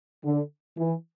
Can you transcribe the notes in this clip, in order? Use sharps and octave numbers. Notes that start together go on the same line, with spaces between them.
D3
E3